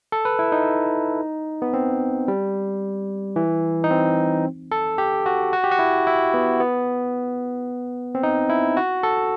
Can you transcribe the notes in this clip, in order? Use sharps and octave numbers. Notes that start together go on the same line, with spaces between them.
A4
B4
E4
D#4
B3
C4
G3
E3
D#4
C4
A4
G4
F#4
F#4
G4
F#4
E4
E4
B3
B3
C4
D#4
E4
F#4
A4